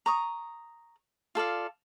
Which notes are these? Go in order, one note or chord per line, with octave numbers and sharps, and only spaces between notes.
A#5 C#6 D#6
F4 A4 D5 F5